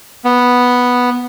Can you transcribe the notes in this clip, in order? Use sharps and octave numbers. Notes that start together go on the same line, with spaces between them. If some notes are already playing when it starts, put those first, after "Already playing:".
B3